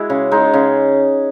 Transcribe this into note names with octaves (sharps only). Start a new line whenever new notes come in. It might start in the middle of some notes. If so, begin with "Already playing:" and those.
Already playing: G#3 E4 F#4 G#4
C#3
G#3 D#4
C#3